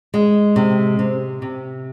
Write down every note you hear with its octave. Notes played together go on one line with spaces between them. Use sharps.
G#3
C3
C3
C3